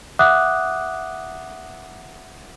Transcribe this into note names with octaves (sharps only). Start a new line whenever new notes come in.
E5 F#5 D6 D#6 F#6